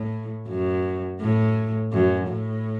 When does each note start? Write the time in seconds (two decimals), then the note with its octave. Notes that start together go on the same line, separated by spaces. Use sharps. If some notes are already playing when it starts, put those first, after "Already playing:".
Already playing: A2
0.49 F#2
1.20 A2
1.93 F#2
2.28 A2